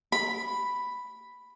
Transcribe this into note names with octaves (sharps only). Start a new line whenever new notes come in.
B5